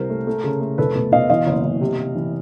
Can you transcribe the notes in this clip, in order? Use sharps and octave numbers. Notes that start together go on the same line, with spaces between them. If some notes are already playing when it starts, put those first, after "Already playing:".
Already playing: C2 C3 A#4 C5
A3
A3
C#3
A3
F1 A4 B4
B2
B2 D#5 F5
E3 D#5 F5
F#1
F#1
C3
C3
E3